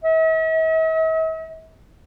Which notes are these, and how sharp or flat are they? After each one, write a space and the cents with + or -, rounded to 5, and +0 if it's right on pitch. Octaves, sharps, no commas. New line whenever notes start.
E5 -45